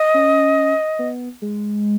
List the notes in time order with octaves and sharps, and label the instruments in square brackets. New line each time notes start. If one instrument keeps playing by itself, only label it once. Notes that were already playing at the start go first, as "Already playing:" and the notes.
Already playing: [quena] D#5
[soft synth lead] C#4
B3
G#3